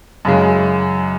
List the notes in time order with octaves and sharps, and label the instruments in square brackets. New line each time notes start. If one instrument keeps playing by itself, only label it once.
[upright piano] F#2 C#3 G#3